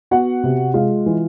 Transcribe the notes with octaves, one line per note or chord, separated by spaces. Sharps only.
B3 F#4 F#5
C3
G#3 F4 F5
E3